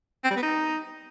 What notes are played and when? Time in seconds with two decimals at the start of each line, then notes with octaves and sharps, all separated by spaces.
0.24 C4
0.30 G3
0.36 B3
0.43 D#4